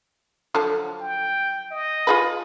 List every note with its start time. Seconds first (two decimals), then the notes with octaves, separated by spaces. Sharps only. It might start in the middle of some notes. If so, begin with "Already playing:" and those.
0.55 D3 F3 F#3
1.00 G5
1.71 D#5
2.07 F4 G#4 B4